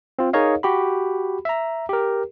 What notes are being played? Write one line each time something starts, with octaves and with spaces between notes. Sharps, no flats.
C4 F4
D#4 G#4 A#4 C#5 D#5 F5
F#4 G4 B5
E5 A#5
G4 A#4